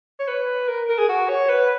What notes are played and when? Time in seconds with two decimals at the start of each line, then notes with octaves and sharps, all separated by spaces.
0.19 C#5
0.28 B4
0.68 A#4
0.89 A#4
0.98 G#4
1.09 F#4
1.29 C#5
1.49 B4